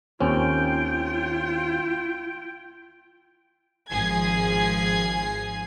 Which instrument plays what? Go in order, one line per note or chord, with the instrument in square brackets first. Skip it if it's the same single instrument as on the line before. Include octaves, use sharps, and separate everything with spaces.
[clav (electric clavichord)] D#2 C4 C#4 [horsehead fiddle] F4 G5
[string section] G#1 F3 G#4 G#5 G#6 C7